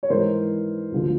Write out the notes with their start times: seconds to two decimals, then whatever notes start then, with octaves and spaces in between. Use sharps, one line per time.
0.03 C#5
0.10 G#2 E3 A#4 C5
0.92 D2 D3 F3